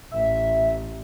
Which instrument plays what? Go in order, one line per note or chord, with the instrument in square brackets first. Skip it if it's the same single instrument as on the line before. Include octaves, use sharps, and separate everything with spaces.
[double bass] A1 [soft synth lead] E5